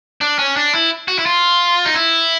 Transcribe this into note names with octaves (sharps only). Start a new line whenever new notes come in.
D4
C#4
D4
E4
F#4
E4
F4
D#4
E4